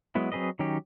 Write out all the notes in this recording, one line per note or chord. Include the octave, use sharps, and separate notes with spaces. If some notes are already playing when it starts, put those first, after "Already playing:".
F#3 G#3 B3 E4
F#3 C4 G#4 B4 D#5
D#3 F#3 C#4 D#4 G4